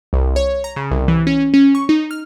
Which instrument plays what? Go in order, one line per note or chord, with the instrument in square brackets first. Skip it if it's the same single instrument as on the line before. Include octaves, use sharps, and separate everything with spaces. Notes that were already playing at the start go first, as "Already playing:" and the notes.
[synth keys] C2
C#5
A#5
C#3
C2
E3
C#4
C#4
C#6
D#4
F6